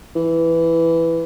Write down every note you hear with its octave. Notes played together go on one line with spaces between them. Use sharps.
E3